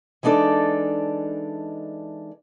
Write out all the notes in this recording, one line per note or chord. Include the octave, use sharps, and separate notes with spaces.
E3 G#3 D4 D#4 A4 D5